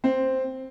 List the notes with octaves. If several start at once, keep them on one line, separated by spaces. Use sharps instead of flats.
C4